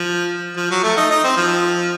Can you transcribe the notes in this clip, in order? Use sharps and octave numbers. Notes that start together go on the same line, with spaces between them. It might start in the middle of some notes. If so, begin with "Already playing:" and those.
Already playing: F3
F3
F#3
A3
D#4
D#4
C4
F3